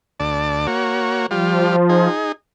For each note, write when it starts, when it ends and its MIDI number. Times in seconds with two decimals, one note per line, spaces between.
0.20 0.67 38
0.20 0.67 74
0.20 0.67 81
0.67 1.26 58
0.67 1.26 66
0.67 1.26 73
1.31 2.08 53
1.31 1.76 55
1.31 1.76 65
1.89 2.32 63
1.89 2.32 68